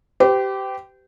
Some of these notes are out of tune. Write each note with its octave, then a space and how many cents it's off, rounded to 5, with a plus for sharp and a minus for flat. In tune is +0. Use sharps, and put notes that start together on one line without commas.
G4 -15 C5 -45